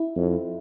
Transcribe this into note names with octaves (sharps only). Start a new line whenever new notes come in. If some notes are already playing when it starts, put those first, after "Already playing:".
Already playing: E4
F2